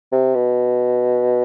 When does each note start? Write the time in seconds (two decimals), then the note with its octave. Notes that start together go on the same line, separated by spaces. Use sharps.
0.12 C3
0.35 B2